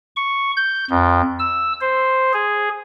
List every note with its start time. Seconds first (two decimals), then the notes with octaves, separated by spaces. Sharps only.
0.16 C#6
0.56 G6
0.90 F2
1.39 E6
1.81 C5
2.33 G#4